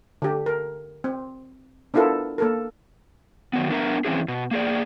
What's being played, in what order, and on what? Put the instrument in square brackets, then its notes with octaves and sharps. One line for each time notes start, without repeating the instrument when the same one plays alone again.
[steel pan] D3 G4
A#4
C4
B3 D4 E4 F4 A4 A#4
A#3 A4 A#4
[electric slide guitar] D#3 F#3 B3
B3 D4 A#4 E5 A#5
E3 C4 C#4 E4 G#4
B2
A#3 G#4 D5